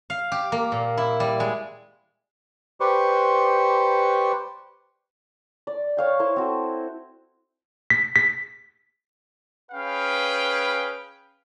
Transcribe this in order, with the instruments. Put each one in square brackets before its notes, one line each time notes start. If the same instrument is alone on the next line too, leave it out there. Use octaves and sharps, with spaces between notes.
[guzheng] F5
G4
A#3
A#2
E4
G3
G#3
[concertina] G4 B4 C5 D5 C#6
[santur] D5
C#5 F5 G5
E4 C5 C6 C#6
C4 F#4 A4
[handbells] B6
B6
[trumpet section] C#4 G#4 B4 F5 G5